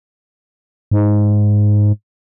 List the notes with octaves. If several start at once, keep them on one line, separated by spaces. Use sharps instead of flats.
G#2